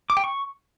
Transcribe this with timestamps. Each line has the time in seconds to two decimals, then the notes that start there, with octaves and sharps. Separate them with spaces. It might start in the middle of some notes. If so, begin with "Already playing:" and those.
0.10 D6
0.17 G5
0.24 C#6